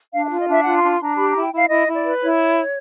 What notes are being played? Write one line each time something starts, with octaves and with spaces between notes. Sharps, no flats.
D4 F5
E5
F4
D#5
D4 E5
F4 F#5
C6
D4
C6
D4 A#5
G4 B5
A#5
E4
G5
E4 F5
E4 D#5
E4
D5
B4
E4 C#5